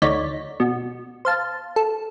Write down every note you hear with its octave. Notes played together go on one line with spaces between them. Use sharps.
D2 D#4 C#5 D5 B6
B2
C5 F5 A5
A4